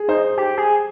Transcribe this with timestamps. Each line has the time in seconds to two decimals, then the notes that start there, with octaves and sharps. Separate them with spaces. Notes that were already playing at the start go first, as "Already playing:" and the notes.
Already playing: G#4
0.08 D#4 C5
0.37 G4
0.58 G#4